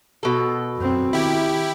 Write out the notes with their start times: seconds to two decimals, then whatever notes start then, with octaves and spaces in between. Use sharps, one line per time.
0.23 B2 A4
0.77 F#2 C4
1.13 D#3 E4 G4